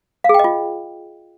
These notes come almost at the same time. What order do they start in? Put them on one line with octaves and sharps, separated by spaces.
F5 G#4 G5 D#5 F4